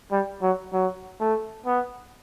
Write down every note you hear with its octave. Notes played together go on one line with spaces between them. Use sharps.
G3
F#3
F#3
A3
B3